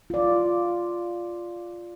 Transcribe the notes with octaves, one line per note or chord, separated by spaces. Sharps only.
F4 D5